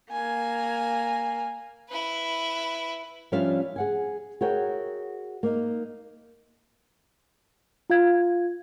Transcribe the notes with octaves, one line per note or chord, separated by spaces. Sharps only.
A#3 G#5
E4 B4
F3 G3 C#4 D4 E5 F5
G#4 F#5 G#5
F#4 G#4 A#4 C#5 E5 G5
A#3 D#4
F4 F5 G#6